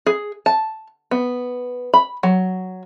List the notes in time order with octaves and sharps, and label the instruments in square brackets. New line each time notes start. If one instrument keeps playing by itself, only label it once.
[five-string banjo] G#4
A5
B3
B5
F#3